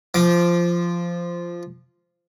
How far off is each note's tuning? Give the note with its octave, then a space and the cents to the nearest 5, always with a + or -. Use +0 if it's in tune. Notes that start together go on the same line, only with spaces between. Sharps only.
F3 -10 D6 +10